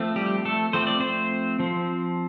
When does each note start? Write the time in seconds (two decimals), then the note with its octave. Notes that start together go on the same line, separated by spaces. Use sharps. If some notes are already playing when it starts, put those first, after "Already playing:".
Already playing: F3 A3 C4
0.16 G3 G4
0.45 A3 A4
0.73 F3 A3 C4 C5
0.87 D5
1.00 C4 C5
1.59 F3 C4